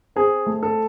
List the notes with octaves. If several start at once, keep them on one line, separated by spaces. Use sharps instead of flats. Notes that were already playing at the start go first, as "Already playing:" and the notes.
C4 G#4
A3
A4